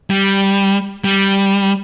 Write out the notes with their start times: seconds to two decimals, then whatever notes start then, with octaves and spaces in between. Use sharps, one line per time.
0.10 G3
1.04 G3